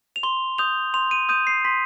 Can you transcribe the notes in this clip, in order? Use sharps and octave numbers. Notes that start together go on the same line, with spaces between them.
F7
C6 G7
D#6 G6 F7
C6 F7
D#7
D#6 G6 D#7
C7
C6 B6